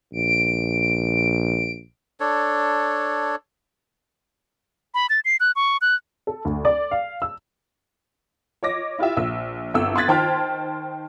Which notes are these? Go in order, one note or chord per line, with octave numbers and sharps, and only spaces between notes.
A#1 D7
D4 A4 C#5
B5
A6
C7
F#6
C#6
F#6
A4
D2
D5
F5
E6
C#5 D#5 D6 A#6
E4 F4 G4 E5
A#1 E6
G1 C2 A4 E6
C6 D#6 F#6 G#6 A6 B6
D#3 C5 G5 A5 C6 F6